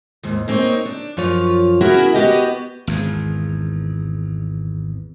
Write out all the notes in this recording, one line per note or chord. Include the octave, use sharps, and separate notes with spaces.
D#2 G#2
A#3 C4 D#4 A4 C#5
D4
F#2 F3 F4 C#5
B3 C#4 E4 F#4 G#4 A#4
B3 F#4 G4 D#5
G#1 E2